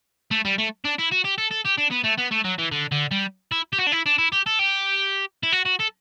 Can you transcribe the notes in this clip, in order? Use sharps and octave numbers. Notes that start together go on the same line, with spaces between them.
A3
G3
A3
D4
E4
F#4
G4
A4
A4
G4
D4
B3
A3
B3
A3
F#3
E3
D3
D3
G3
E4
G4
F#4
D4
E4
D4
E4
G4
A4
G4
E4
F#4
F#4
A4